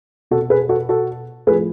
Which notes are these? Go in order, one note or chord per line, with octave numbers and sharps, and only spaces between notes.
B2 F#4 A4
G#4 B4
F#4 A4
F#4 A4
A2 F3 G#4 B4